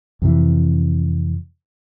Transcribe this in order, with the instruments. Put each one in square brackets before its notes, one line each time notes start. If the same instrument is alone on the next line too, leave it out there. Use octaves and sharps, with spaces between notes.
[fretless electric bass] F2 C3 E3